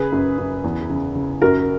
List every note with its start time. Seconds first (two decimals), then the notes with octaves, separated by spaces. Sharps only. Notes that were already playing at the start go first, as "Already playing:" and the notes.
Already playing: C#3 G#4 B4
0.12 F#2
0.38 F#2
0.64 E2
0.89 C#3
1.15 C#3
1.42 F#2 F#4 A#4